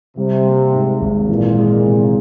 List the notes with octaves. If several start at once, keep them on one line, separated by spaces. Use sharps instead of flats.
C3 G3
A#3
G#2
G#1
A#2 E3
G#3
C3